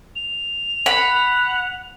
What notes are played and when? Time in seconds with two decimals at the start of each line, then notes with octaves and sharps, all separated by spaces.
0.16 F7
0.86 F#5 B5